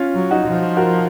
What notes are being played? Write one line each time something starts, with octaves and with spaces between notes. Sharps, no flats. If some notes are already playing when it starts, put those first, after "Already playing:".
Already playing: C#4 F4
F#3
D#4 F#4
F3
F#4 A#4